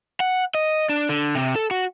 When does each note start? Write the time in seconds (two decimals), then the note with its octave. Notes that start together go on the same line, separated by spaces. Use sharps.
0.20 F#5
0.55 D#5
0.89 D4
1.09 D3
1.35 C3
1.56 A4
1.71 F#4